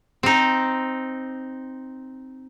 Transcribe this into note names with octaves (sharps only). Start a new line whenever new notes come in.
C4 D#4